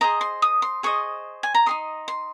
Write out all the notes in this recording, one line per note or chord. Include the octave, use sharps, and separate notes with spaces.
G#4 C5 D#5 A#5
C6
D#6
C6
G#4 C5 D#5 C#6
G#5
A#5
D#4 G#4 D#5 C6
C6